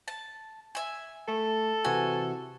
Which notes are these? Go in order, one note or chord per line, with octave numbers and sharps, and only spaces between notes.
A5
E5 G#5
A3 A4
C3 E3 F#4 G#5